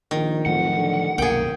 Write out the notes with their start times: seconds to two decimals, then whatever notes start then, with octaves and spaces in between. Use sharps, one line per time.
0.11 A#1 D#3
0.46 F2 A2 F3 F#3 F#5
0.75 D3
1.18 C2 F#2 B2 A#3 G#4 G5